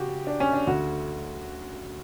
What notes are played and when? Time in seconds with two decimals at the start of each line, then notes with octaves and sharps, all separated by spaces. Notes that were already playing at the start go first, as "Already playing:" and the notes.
Already playing: C#3 F#4 G4
0.27 D4
0.40 C#4
0.53 D4
0.67 D2 D3 F#4